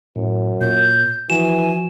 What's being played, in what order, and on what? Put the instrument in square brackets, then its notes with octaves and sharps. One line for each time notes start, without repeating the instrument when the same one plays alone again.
[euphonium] F#2 [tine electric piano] A2
[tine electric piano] A#2 C#5 [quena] G6
[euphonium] E3 [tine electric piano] F3 F#4 [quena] G#5 [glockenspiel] E7